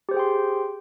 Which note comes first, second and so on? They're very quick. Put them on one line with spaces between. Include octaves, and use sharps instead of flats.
G4 C5 G#4 G5 C6